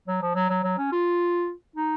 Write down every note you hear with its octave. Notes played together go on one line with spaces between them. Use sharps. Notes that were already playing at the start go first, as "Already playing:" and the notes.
F#3
F3
F#3
F#3
F#3
C#4
F4
D#4